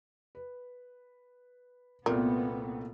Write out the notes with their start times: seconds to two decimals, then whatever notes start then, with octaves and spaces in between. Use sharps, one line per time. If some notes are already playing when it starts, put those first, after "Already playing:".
0.35 B4
2.06 C2 A#2 A3 B3 C4 A#4